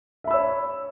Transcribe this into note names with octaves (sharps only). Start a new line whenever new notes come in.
C#5 E5 B5 E6